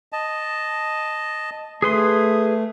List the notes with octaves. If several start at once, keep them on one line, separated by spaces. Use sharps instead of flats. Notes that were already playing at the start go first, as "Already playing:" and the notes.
D#5 A5
A3 G#4 B4 C6 D#6